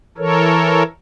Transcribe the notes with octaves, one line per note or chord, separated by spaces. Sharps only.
E3 A4 A#4 C#5